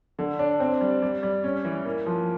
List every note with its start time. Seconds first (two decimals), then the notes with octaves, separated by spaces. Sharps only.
0.19 D3
0.39 D4
0.60 C4
0.81 G3
1.02 G3
1.23 G3
1.44 C#4
1.65 E3
1.85 A#3
2.06 F3